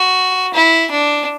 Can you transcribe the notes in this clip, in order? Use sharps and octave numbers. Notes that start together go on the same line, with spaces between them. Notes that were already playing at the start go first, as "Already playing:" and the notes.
Already playing: F#4
E4
D4